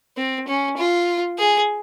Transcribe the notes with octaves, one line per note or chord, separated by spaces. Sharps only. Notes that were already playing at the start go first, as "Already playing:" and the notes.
C4
C#4
F4
G#4